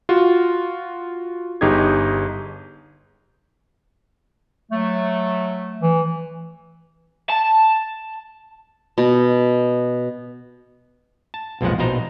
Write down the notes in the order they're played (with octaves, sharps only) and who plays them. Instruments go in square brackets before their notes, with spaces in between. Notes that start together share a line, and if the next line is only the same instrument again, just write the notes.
[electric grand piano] F4 F#4
G1 D#4 G4 G#4 G#6
[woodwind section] F#3 A3
[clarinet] E3
[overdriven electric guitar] A5
[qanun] B2
[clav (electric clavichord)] A5
B1 F2 A#2 F3 G#3 F#5
A#1 B2 D#4 C5 A#5